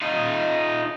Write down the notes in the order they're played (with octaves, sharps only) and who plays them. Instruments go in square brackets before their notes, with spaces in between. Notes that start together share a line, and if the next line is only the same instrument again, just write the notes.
[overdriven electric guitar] D#4 F4